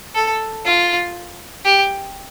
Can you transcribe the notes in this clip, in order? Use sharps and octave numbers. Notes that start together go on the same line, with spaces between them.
A4
F4
G4